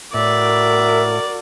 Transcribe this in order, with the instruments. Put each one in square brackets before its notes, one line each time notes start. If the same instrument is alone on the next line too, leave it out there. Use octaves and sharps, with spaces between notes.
[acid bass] A2 [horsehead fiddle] F#4 A#4 [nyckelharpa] D5 [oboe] E5